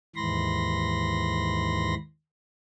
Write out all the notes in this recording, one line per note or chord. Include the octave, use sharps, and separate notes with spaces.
D#2 G#2 E3 B5 C6 A#6